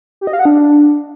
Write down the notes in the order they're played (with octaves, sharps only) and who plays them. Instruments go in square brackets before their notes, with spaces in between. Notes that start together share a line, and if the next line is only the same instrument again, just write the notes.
[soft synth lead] G4
D#5
F5
F#5
D4